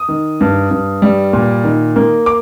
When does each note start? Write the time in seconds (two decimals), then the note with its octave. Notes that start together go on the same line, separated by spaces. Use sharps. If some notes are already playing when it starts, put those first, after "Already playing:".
Already playing: D#6
0.08 D#3
0.41 G2
0.71 G2
1.02 G3
1.33 A#2
1.64 D#3
1.96 A#3
2.26 D6